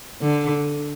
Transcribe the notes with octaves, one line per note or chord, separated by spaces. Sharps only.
D3